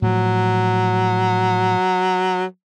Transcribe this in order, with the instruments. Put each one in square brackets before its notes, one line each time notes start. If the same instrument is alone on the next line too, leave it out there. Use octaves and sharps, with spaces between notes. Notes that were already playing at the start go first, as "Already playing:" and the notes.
[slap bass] A2 F3 [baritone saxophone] F#3